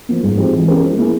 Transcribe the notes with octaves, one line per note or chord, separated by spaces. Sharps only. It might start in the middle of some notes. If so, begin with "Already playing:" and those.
F3 A#3
G#2
F3 G#3 C4 G4
E3
G#3 C#4 G4 A#4
F3
A#3 E4 G#4